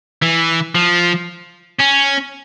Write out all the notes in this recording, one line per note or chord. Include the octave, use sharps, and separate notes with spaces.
E3
F3
C#4